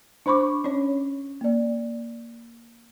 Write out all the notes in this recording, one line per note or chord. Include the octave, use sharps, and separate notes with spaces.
D4 C5 B5 C#6 D6
C#4 C#5
A#3 D5